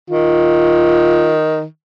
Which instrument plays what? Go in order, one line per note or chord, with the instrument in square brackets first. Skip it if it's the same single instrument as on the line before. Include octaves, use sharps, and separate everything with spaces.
[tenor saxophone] D#3 [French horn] F4